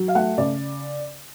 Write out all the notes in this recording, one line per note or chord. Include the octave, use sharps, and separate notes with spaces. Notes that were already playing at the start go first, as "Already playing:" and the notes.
Already playing: F#3
F5
A3 F#5
C#3 D5